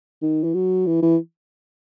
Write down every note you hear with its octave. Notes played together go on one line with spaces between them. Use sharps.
D#3
E3
F#3
E3
E3